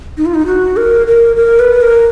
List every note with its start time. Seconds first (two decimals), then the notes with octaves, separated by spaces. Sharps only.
0.17 D#4
0.26 F4
0.34 D#4
0.46 F#4
0.77 A#4
1.07 A#4
1.36 A#4
1.59 B4
1.81 A#4